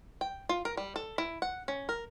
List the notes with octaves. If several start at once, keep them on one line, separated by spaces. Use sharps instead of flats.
G5
F4
A#4
G3
A4
E4
F#5
C#4
A#4